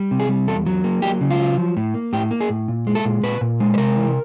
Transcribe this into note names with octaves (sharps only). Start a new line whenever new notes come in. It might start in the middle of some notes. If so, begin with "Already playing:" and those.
Already playing: G3
C3
G#4
G3
E2 A4
F#3
A#3
F#3 G4
C#3
F4
F#3
F3
A2
A#3
A2 G4
A#3
G#4
A2
A#2
G#3
A4
A#2
A#2 B4
A#2
G#3
B4
C3 A#4
E3